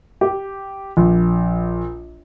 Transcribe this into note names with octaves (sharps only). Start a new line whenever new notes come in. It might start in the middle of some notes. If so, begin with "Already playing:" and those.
G4
A#1